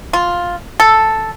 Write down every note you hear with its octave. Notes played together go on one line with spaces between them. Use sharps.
F4
A4